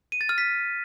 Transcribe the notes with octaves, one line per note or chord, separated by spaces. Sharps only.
D#7
A6
F6
B6